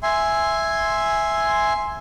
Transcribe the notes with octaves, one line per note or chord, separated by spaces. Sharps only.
E5 G#5 C6